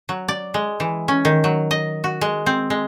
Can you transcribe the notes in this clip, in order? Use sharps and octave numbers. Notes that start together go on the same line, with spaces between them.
F#3
D5
G#3
E3
C#4
D#3
F#3
D#5
F#4
G#3
C4
G#3